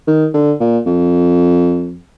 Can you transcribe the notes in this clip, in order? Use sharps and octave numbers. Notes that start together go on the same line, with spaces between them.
D#3
D3
A#2
F2